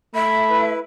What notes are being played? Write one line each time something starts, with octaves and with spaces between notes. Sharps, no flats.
A3 E5 B5
E4 B4